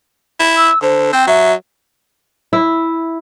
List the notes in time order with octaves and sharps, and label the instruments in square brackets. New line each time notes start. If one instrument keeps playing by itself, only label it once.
[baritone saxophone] E4
[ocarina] E6
[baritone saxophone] D3 [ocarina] C5
[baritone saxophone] C4 [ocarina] G5
[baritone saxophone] F#3 [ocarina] E5
[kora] E4